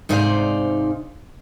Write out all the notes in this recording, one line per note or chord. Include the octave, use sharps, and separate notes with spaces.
G#2 C3 D#4 C5 D5 F5